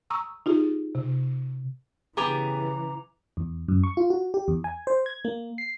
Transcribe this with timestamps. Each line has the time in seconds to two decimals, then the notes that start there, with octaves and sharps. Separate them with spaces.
0.10 A#5 C#6 D#6 E6
0.46 D#4 F4 G4 G#4
0.95 C3
2.17 C#3 E3 B3 G4 G#4 A#5 D6 F7
3.37 E2
3.68 F#2
3.84 C#6
3.97 F4
4.10 F#4
4.34 G4
4.48 E2
4.64 G#5
4.87 C5
5.06 G#6
5.25 A#3
5.58 C7